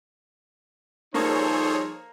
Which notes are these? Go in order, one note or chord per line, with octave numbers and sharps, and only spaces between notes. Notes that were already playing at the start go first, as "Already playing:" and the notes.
F3 G3 A#3 D#4 G#4 A4 C5 C#5